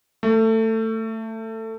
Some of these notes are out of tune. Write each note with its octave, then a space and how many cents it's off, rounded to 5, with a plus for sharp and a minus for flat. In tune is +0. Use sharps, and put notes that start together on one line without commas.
A3 +20